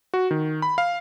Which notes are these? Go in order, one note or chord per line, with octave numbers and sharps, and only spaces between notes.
F#4
D#3
B5
F5